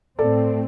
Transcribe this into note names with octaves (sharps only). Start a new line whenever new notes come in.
A2 A3 C4 A4 D5